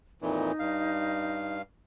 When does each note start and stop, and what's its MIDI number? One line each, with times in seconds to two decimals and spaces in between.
0.22 0.52 41
0.22 0.52 46
0.22 0.52 52
0.22 1.58 63
0.59 1.62 43
0.59 1.62 77